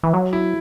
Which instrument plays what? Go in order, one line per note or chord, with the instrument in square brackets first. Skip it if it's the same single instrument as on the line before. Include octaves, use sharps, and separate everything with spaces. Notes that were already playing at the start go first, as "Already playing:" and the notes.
[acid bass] E3
F#3
[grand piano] E4